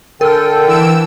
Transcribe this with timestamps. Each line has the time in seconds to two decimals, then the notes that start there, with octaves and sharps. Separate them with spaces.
0.21 D3 A4 A#4 G5 F6
0.67 E3 E6 D7